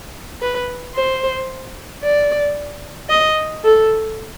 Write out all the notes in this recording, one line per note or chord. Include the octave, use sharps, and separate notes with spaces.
B4
C5
D5
D#5
A4